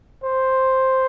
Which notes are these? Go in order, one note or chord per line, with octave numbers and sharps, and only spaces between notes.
C5